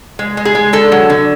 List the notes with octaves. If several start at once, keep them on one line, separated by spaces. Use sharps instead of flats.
G#3
G#3
G#4
G#3
D3 A4
F#3
D3